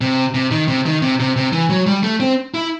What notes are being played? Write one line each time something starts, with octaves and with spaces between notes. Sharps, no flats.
C3
C3
D#3
C3
D#3
C3
C3
C3
E3
F#3
G3
A3
C4
E4